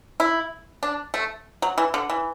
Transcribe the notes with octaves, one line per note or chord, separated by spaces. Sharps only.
E4
D4
A3
F#3
E3
D3
E3